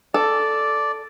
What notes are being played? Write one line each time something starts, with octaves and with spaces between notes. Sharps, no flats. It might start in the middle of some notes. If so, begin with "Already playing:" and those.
A4 D5